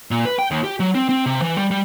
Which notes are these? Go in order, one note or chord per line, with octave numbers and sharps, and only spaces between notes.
A#2
B4
G5
D#2
G4
F#3
C4
C4
C3
E3
G3
G3